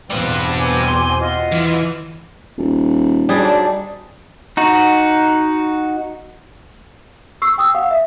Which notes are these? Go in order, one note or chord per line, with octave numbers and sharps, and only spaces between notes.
E2 B2 G3 C4 B4
G5 G#5 D6
C6
F4 D#5 F#5
E3
D#1
G#2 F#3 G3 D4 G#4
D#4 F#4
C#6 E6 C7
G5 D#6 E6
F5 F#5
E5